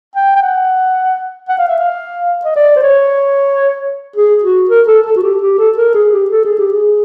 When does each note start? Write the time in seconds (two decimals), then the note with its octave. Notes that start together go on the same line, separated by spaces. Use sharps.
0.16 G5
0.36 G5
0.42 F#5
1.49 F#5
1.59 F5
1.68 E5
1.79 F5
2.45 D#5
2.56 D5
2.76 C5
2.83 C#5
4.16 G#4
4.43 F#4
4.69 A#4
4.87 A4
5.06 A4
5.17 F#4
5.23 G4
5.42 G4
5.58 A4
5.77 A#4
5.95 G#4
6.13 G4
6.30 A4
6.45 G#4
6.59 G4
6.72 G#4